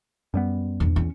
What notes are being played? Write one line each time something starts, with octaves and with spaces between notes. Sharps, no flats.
F#2 G3 B3
E2 D3
E2 C#4